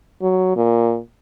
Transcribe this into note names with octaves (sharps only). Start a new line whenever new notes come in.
F#3
A#2